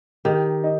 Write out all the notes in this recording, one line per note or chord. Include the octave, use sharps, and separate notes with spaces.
D#3 G4
D#4